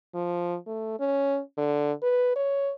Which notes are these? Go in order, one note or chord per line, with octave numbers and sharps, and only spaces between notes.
F3
A3
C#4
D3
B4
C#5